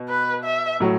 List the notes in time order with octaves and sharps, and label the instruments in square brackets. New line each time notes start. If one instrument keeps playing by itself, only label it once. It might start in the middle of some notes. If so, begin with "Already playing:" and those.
Already playing: [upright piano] B2
[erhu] B4
E5
[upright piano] A2 F#3